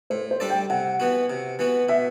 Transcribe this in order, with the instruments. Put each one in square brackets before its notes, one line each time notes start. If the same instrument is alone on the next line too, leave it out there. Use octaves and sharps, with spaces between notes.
[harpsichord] A2 [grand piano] C5
[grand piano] C5
[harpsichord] G3 D4 A4 D5
[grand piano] G5
[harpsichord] C3 [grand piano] F#5
[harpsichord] E3 B3 F#4
C3
E3 B3 F#4
[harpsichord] B2 [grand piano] E5